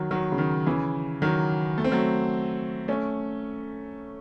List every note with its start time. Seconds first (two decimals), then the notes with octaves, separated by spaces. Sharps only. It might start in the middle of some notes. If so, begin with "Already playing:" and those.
Already playing: D#3 F#3
0.11 D#3 F#3
0.32 C#3
0.38 D#3
0.66 C#3 E3
1.22 D#3 F#3
1.78 A3
1.84 C4
1.92 F#3 A3
2.88 A3 C#4